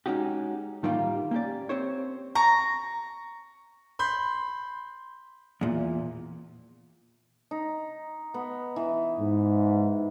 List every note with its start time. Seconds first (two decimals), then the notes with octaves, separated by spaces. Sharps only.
0.06 G#3 C#4 D#4 F#4 G4
0.83 A2 D#3 G3 A#3 F4 G4
1.31 A#3 C#4 G4 D5
1.69 C4 G4 C5 C#5
2.35 A#5 C#6
3.99 B5 C6 G6
5.61 E2 A#2
7.51 D#4
8.34 B3
8.76 E3
9.20 G#2